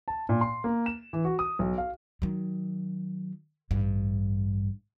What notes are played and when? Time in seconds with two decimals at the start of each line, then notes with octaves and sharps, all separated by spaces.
0.08 A5
0.29 A#2
0.41 C6
0.64 A#3
0.86 E7
1.13 E3
1.25 F#4
1.39 D#6
1.59 B1
1.78 F5
2.22 D#3 F#3
3.71 A1 G2